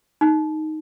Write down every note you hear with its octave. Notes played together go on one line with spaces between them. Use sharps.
D#4